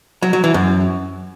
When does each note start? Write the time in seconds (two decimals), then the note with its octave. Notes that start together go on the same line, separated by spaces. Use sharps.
0.22 F#3
0.33 F#3
0.44 E3
0.54 F#2